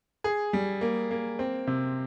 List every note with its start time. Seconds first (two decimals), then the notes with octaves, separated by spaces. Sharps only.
0.24 G#4
0.53 G3
0.81 A#3
1.11 A#3
1.39 C4
1.67 C3